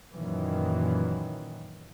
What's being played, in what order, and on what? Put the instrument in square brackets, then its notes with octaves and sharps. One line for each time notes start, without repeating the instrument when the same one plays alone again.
[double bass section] F#2 A#2 D#3 E3